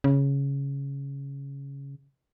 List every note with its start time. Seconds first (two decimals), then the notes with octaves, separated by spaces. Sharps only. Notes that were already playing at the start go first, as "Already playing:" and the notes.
0.04 C#3